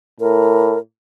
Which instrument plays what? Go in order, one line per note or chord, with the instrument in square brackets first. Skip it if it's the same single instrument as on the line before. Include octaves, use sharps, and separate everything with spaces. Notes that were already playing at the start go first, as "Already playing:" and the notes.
[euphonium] A2 [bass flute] A#4